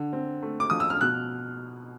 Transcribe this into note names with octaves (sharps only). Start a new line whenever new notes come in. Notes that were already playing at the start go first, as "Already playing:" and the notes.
Already playing: D3
C4
A3
D6
F3 D#6
E6
F6
B2 F#6